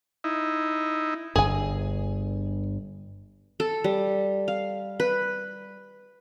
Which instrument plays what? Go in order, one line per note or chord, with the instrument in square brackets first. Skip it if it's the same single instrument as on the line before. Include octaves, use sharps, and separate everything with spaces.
[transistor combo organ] D#4 E4
[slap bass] G1 G2 [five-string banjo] G#4 G#5
[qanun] A4
G3
F5
B4